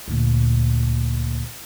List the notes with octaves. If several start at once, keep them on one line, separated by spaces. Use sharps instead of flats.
D2 A#2